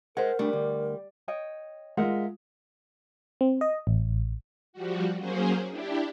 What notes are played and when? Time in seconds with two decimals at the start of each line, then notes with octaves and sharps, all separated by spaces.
0.17 G#3 A#4 C5 F#5
0.39 G3 A3 D4
0.53 D2
1.28 C#5 D#5 G5
1.97 G#3 F4 A#4 E5 F#5
3.41 C4
3.61 D#5
3.87 A1
4.73 F3 G3 F#4
5.17 F#3 A#3 C#4 G#4 C5
5.70 D4 E4 G4